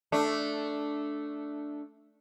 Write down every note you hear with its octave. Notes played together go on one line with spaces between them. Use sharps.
A3 D4